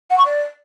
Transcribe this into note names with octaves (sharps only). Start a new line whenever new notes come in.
F#5
C#6
D5